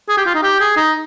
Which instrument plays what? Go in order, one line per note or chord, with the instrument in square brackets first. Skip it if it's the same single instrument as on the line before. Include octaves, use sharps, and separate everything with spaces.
[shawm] G#4
G4
F4
D#4
G4
G#4
D#4